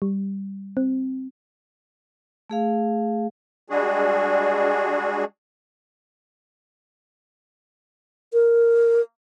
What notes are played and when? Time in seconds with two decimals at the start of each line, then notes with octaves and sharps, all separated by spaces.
0.02 G3
0.77 C4
2.50 A3 G#4 F5
3.70 G3 G#3 D4 F#4 G#4
8.33 A#4